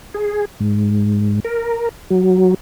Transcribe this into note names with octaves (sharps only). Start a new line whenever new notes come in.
G#4
G#2
A#4
F#3